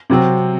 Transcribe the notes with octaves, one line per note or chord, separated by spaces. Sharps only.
C3 F#3 C4